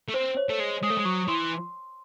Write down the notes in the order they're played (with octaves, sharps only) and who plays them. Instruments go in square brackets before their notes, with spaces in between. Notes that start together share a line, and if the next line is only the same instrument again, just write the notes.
[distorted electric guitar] A3
[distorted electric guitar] C4 [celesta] C5
[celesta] C#5
[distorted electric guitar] A3
G#3
[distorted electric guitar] G#3 [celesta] D#6
[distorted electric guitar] A3
G#3
[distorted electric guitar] F#3 [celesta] C#6
[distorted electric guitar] E3 [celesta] C6